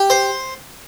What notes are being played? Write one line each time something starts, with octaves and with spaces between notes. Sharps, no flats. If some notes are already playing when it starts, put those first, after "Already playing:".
Already playing: G4
C5